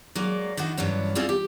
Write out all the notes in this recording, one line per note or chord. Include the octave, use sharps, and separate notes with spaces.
F#3 G#3 A#3 D5
D#3 D4 E4 F#4
G2 E3 F#3 C#4 D4
C4 C#4 E4 F4 G#4 D5
G4